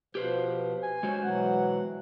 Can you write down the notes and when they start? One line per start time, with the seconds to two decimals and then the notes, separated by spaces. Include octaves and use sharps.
0.15 B2 F3 G4 B4 C5
0.83 G#5
1.03 G#3 C#4 F#4 C5
1.23 B2 E3 F#3 F#5